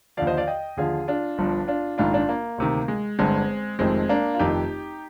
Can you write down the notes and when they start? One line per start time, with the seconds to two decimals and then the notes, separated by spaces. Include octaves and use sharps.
0.17 D#2 D3 F3 D5 F5
0.27 C5 D#5
0.37 D5 F5
0.47 D#5 G5
0.77 D#2 D3 F3 F4 G#4
1.08 D4 F4
1.38 G1 G2 F3
1.68 D4 F4
1.98 A#1 G#2 D#3 D4 F4
2.13 D4 F4
2.29 A#3
2.58 D2 C3 D#3
2.88 G#3
3.19 G1 G2 D3 G#3 C4
3.79 F1 F2 D#3 G#3 C4
4.09 A#3 D4
4.35 F4
4.39 F1 F2 D#3 D#4 G4